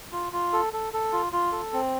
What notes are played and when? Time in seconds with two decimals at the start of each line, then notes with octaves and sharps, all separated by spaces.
0.12 F4
0.33 F4
0.53 A4
0.73 A4
0.93 A4
1.13 F4
1.33 F4
1.52 A4
1.73 C4